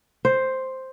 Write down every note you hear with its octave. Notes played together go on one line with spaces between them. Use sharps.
C5